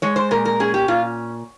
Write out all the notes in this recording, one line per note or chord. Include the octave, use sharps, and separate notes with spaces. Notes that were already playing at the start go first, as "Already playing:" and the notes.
G#3 C#5
C5
A#2 A#4
A#4
C#4 G#4
G4
A#2 F4